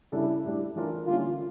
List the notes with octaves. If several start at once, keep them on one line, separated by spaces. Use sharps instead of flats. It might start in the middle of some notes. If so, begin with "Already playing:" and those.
C#3 G3 D4 E4 A4
A2 G3 D4 G4
E3 A3 D4 F4 A#4
D3 G3 A#3 C#4 E4 F4